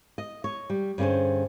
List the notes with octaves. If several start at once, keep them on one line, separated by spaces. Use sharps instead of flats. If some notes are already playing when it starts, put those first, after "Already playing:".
D#5
C#5
G3
G2 D3 C#4 G#4 C5